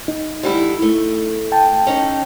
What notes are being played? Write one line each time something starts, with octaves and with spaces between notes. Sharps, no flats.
D#4
D3 G3 E4
A3
G5 A5
C#4 D#4